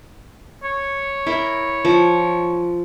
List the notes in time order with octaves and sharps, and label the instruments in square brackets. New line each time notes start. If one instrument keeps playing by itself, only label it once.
[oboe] C#5
[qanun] E4 A#4
F3